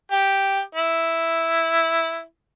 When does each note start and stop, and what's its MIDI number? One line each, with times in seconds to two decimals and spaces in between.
0.12 0.60 67
0.75 2.22 64